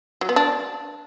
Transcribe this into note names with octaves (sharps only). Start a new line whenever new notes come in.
F#3
B3
D4